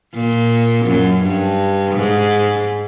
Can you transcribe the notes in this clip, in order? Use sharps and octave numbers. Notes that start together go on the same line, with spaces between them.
A#2
F#2
G2
G#2